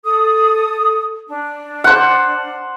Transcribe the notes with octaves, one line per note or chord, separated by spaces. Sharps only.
A4 D#6
D4
C5 F#5